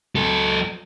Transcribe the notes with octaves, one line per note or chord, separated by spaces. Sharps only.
F#3 A4